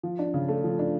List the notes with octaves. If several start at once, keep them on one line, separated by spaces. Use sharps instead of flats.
F3
D4
C#3
A3
F3
D4